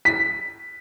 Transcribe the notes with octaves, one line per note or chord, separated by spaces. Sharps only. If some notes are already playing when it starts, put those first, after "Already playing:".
B6